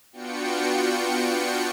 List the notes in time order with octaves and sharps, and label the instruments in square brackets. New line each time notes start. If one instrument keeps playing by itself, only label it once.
[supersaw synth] B3 D4 F4 F#4 G5 C#7